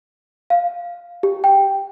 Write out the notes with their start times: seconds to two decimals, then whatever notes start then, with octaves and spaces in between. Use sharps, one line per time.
0.50 F5
1.23 G4
1.44 G5